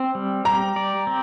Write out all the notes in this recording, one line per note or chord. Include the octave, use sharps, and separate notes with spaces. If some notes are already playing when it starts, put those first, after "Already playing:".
Already playing: C4
G3
G4 A#5
D5
C4